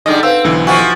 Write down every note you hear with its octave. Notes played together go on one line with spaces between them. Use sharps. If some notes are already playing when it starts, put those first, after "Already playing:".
D3 G3 G#3 D#4 A4 D#5
C4 B4 F5 E6 G6
B1 D3 E3
F3 E4 F#4 G#5